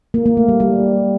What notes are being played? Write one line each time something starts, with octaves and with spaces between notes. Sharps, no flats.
A#3
A#3
A3
G3
G3